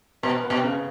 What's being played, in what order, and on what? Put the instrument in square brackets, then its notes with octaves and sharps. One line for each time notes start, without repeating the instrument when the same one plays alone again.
[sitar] B2 [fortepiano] B3
[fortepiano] B3
[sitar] B2
[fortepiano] C#3